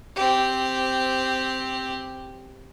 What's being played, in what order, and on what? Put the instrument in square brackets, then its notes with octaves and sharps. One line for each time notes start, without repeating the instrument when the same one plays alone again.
[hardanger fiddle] C4 G4